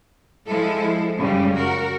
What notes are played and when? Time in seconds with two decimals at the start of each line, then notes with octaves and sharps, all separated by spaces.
0.46 F3 G#3 E4 A4
1.17 F#2 C#3 G3 G#3
1.54 F#4 A#4